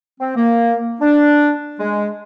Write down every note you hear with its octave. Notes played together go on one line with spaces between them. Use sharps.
C4
A#3
D4
G#3